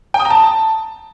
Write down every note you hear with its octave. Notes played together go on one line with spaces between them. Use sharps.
G5
D#6
A#5
A5